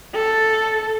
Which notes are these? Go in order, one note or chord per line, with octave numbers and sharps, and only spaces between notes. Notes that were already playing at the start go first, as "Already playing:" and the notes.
A4